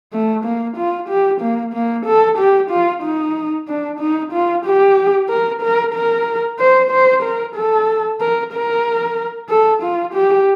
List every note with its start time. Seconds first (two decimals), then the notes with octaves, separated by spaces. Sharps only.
0.13 A3
0.45 A#3
0.77 F4
1.09 G4
1.41 A#3
1.74 A#3
2.06 A4
2.38 G4
2.71 F4
3.03 D#4
3.68 D4
4.00 D#4
4.33 F4
4.65 G4
5.30 A#4
5.62 A#4
5.94 A#4
6.59 C5
6.91 C5
7.23 A#4
7.55 A4
8.21 A#4
8.53 A#4
9.49 A4
9.82 F4
10.14 G4